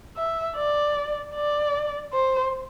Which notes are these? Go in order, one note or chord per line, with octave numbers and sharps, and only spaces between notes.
E5
D5
D5
C5